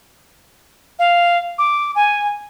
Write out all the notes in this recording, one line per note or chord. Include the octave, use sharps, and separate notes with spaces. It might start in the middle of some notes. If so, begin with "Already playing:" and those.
F5
D6
G#5